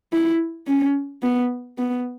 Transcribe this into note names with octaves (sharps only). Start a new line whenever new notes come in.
E4
C#4
B3
B3